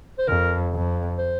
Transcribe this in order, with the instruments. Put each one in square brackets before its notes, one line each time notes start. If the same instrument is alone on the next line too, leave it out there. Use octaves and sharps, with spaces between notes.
[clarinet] C5
[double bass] F2 [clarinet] A#4
[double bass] F2
[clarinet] C5